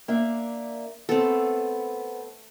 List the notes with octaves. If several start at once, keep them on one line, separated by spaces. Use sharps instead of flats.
A#3 D4 E5
A3 B3 C4 A4